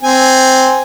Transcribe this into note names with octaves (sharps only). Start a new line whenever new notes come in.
C4 G#5